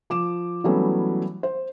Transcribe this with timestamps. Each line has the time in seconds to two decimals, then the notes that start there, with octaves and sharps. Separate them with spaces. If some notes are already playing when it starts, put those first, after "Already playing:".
0.10 F3 D6 E7
0.64 E3 F#3 G3 A3 B3 C#4
1.43 C5